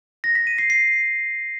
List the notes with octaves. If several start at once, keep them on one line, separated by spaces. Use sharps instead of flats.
A#6
B6
D#7
C7
C7